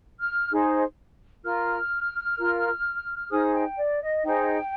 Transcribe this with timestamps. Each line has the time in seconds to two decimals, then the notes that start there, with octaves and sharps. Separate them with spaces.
0.20 F6
0.51 D#4 G#4 C5
1.44 F4 A#4 F6
2.38 F4 A#4
3.31 D#4 G#4 C5 D#6
3.54 G5
3.78 D5
4.01 D#5
4.24 D#4 G#4 C5 G5